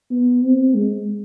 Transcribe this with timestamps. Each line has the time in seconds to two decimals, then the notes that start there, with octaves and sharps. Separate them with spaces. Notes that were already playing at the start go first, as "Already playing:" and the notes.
0.11 B3
0.43 C4
0.75 G#3